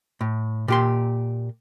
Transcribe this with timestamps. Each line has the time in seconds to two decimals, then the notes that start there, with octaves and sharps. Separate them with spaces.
0.21 A2
0.68 A#2 G4 C6